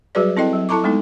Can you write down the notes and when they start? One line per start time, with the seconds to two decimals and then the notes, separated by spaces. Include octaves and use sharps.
0.15 F#3 G3 F#4 G#4 B4 D5
0.37 C4 E4 A4 D#5 G5
0.53 F#3
0.69 E4 A4 A5 A#5 C#6 D6
0.83 G3 G#3 B3 D#4 A4